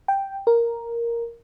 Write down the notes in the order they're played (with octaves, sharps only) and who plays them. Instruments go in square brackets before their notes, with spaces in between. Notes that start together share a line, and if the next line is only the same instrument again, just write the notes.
[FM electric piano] G5
A#4